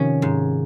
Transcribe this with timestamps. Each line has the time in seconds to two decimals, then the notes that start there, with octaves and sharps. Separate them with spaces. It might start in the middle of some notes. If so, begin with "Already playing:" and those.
Already playing: C3 D#3 F3 C#4
0.22 G#2